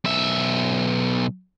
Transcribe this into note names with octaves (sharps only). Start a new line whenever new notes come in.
B1 E5